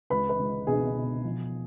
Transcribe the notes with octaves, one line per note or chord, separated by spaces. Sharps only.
C#2 B4 B5
B4 B5
C#2
B2 G#4 G#5
B2
F3